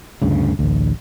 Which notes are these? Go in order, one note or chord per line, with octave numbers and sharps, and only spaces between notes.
D2 G2 C#3
A1 D2